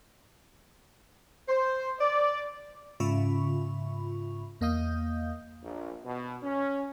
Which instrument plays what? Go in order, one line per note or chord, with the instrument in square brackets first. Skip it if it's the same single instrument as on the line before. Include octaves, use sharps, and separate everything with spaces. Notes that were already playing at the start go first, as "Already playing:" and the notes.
[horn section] C5
D5
[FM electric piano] G#2 C#3 F4 E5 B5 C#6
E2 A#3 D#5 F5 D#6 G6
[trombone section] A#1
B2
C#4